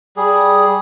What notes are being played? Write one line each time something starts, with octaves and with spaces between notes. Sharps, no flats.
G3 G#4